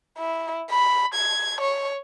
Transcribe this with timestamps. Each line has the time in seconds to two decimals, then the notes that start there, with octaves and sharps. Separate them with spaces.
0.18 E4
0.71 B5
1.14 G#6
1.61 C#5